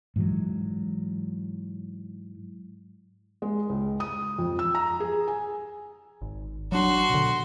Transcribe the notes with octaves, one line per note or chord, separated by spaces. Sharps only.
G#2 E3 F#3
G#3
C#2
D#6
F2
E6
A#5
G#4
G#5
G#1
F#3 D4 F#4 C6
B2 D3